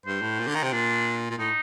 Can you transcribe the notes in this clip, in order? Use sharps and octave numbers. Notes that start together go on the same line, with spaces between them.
G2 C5
A2
A#2
D3
D#3
C3
A#2 D4
A#2
A2 D#4